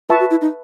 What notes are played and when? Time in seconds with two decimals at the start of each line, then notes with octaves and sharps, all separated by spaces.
0.09 F4 B4 E5 A5 C#6
0.20 F#4
0.31 E4
0.41 D#4